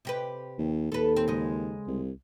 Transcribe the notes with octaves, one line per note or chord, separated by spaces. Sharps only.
C3 G4 B4
D#2
D#2 A4 B4
C4
C#3 G#3
C2